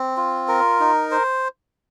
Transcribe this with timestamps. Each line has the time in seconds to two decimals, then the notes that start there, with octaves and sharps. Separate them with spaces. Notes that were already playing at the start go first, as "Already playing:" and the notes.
Already playing: C4
0.17 F4
0.48 A#4
0.80 D#4
1.11 C5